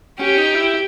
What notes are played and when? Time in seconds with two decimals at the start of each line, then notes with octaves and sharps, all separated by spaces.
0.19 C#4 G4
0.38 D#4
0.55 E4